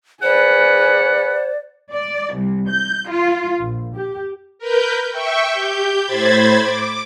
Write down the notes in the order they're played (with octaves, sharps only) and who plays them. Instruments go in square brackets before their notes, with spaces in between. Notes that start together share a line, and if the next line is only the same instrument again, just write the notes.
[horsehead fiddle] G#4 B4 [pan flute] C5 [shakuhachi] D5 [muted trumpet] F#5
[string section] D5
C2
G6
F4
A#1
G4
[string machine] A#4 B4 G6
E5 G5 C#6
G4 G6
A2 C5 B5 G#6 A6
D6